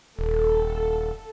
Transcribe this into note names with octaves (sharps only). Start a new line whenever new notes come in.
D#1 A4